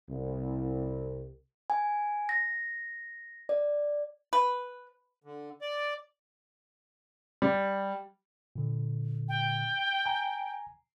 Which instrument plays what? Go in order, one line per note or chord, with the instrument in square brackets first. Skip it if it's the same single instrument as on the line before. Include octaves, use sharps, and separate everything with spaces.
[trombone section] C2
[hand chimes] G#5
A#6
D5
[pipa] B4
[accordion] D3
D5
[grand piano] G3
[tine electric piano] A#2 D3
[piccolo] G5
[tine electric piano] G#5 A#5